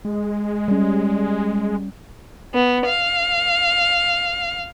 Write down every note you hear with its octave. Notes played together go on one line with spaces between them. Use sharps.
G#3
G3 C#4
B3
F5